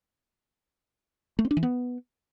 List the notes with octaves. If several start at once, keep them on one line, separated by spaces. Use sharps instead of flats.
A3
C4
D4
E3
B3